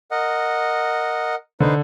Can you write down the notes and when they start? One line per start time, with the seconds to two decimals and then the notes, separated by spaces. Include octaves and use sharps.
0.11 A#4 D#5 F#5
1.60 D3 D#4 B4 C5